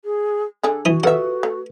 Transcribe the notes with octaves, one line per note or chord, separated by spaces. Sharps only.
G#4
D3 D4 G#4 A4
E3 F#4 D#6
F4 G4 A4 B4 E5 F#5
A3